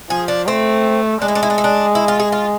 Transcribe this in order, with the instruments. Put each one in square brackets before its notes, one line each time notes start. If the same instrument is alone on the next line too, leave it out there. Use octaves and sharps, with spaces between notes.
[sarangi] F3 [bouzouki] G#4
[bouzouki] D4
[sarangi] A3 [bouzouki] C4
[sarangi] G#3 [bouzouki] D4
[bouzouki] E4
D4
E4
D4
E4
D4
E4
F4
G#4
F4